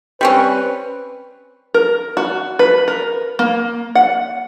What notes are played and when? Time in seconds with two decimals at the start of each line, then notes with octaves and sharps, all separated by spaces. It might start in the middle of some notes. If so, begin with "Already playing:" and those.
0.21 G3 C4 C#4 B4
1.74 A#4
2.17 F#4
2.59 B4
2.88 A#4
3.39 A#3
3.95 F#5